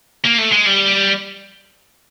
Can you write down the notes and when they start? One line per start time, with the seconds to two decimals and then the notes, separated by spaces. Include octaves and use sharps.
0.24 A#3
0.38 A3
0.52 G#3
0.66 G3